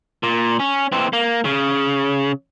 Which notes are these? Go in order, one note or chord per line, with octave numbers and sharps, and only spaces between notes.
A#2
C#4
E3 C4
A#3
C#3